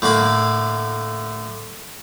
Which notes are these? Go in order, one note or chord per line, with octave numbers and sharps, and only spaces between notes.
A2 D3 A#3 B5